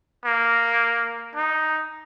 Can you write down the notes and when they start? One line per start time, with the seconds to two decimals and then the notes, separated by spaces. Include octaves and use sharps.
0.25 A#3
1.35 D#4